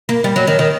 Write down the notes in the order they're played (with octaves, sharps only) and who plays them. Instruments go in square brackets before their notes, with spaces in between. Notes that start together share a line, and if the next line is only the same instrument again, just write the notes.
[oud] A#3
G3
F#3
D#3
D#3